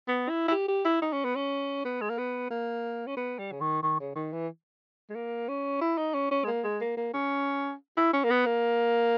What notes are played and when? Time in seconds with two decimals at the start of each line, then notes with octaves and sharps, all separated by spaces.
0.08 B3
0.30 E4
0.48 E4
0.52 G4
0.68 G4
0.85 E4
1.02 D#4
1.13 C#4
1.25 B3
1.36 C#4
1.85 B3
2.01 G#3
2.10 A#3
2.18 B3
2.50 A#3
3.07 C#4
3.17 B3
3.39 G3
3.52 C#3
3.61 D#3
3.83 D#3
4.00 C#3
4.15 D#3
4.33 E3
5.10 G#3
5.15 A#3
5.49 C#4
5.82 E4
5.98 D#4
6.14 C#4
6.31 C#4
6.44 G#3
6.47 A#3
6.64 G#3
6.81 A#3
6.97 A#3
7.13 C#4
7.97 E4
8.13 C#4
8.24 A#3
8.30 B3
8.46 A#3